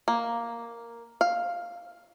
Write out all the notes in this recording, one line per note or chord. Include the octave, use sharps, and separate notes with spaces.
A#3
F5